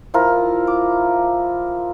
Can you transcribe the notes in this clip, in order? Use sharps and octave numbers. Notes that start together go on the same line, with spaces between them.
F3 E4 F4 A#4
D6